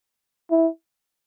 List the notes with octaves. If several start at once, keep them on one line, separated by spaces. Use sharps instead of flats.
E4